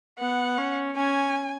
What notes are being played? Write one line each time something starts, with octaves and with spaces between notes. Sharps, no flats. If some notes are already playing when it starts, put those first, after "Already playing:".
B3 F#5
C#4
C#4 G#5